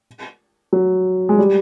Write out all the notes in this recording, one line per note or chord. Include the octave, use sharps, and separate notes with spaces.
F#3
G#3
G3